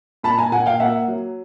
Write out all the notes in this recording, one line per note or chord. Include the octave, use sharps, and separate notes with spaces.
A#2 A5 B5
G#5 A#5
A#2 F#5 G#5
F5 G5
A#3 E5 F#5
F#3